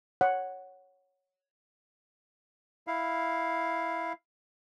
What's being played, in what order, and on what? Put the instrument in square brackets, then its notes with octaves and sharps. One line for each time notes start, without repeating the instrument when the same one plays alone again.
[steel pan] C#5 F#5
[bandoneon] E4 F5